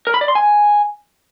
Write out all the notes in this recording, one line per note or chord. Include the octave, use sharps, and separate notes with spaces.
A#4
B5
D5
C6
G#5